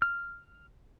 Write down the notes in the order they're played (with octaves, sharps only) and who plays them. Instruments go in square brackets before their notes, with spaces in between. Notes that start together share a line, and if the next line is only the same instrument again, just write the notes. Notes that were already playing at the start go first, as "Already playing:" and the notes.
[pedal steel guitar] F6